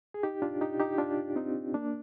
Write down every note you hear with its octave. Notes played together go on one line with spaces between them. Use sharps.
G#4
D#4 G4
D4 F4
D#4 G4
D#4 G4
D4 F4
C4 D#4
A#3 D4